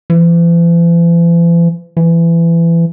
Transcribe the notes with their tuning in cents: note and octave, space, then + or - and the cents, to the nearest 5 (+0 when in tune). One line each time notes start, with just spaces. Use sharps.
E3 +45
E3 +25